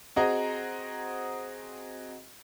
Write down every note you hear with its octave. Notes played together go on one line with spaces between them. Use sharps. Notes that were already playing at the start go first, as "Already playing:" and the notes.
C4 F#4 G#4 D#5 A#5